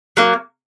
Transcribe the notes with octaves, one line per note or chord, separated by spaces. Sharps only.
F#3 A#3